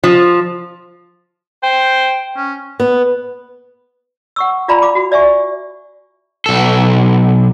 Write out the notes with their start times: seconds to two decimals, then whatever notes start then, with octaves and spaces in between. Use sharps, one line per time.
0.04 F3
1.63 C5 G5
2.36 C#4
2.80 B3
4.36 F#5 C#6 E6
4.68 F4 D5 F5 G#5 A#5 B5
4.83 F5 B5 D6
4.95 F#4
5.12 D5 E5 G#5 C#6
6.46 B1 A4